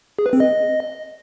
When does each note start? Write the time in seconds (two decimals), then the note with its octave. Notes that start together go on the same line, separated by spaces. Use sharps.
0.19 G#4
0.26 B4
0.33 C4
0.40 D#5